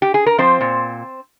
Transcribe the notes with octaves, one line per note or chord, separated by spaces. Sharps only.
G4
G#4
A#4
F3 C4 C5
A#2